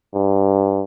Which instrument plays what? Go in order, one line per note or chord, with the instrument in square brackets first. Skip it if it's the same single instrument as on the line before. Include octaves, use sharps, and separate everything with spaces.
[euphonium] G2